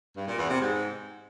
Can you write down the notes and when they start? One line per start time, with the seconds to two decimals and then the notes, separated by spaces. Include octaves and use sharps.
0.16 G2
0.27 A#2
0.38 E2
0.49 C3
0.60 G#2